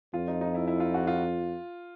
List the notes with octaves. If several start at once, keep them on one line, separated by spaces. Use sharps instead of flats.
F2 F4
D#4
D#4
E4
E4
F4
F#4
F4